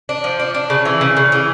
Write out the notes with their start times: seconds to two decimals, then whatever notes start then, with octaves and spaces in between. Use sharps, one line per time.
0.09 D4
0.24 F3
0.40 D4
0.54 D4
0.70 C#3
0.85 E3
1.01 C#3
1.17 C#3
1.32 E3